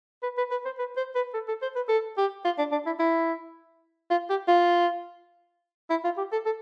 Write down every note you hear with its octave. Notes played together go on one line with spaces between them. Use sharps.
B4
B4
B4
C5
B4
C5
B4
A4
A4
C5
B4
A4
G4
F4
D4
D4
E4
E4
F4
G4
F4
E4
F4
G4
A4
A4